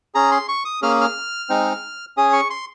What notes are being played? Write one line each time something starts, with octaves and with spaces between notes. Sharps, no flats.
C#4 G#4 A#5
C6
C#6
D#6
A#3 C#4 G#4 F6
F6
G#3 C4 D#4
C#4 G#4 D#6
C#6
C6